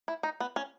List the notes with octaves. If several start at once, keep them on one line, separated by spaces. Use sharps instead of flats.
E4
D#4
B3
C#4